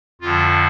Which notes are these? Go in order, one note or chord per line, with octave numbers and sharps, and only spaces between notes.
F2 D3 F3 F4